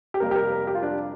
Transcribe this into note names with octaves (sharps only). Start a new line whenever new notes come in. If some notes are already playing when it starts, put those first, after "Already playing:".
G4
F2 C3 G3 A#3 A#4
G4
A#4
A#4
G4
F4
D4